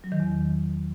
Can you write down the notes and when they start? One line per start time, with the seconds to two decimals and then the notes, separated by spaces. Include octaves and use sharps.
0.04 F#3
0.12 D#3
0.20 E2